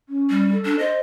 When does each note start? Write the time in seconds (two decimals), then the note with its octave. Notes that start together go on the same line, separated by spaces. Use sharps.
0.09 C#4
0.30 G3
0.52 A4
0.65 D4
0.79 C5 D#5